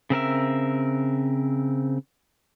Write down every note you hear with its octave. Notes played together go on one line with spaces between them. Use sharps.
C#3 C4 A#4 E5